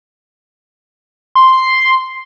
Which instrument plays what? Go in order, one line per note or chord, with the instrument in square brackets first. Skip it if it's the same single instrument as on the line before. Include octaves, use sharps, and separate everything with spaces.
[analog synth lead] C6